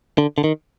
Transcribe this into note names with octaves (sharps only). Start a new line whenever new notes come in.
D3
D3
D#3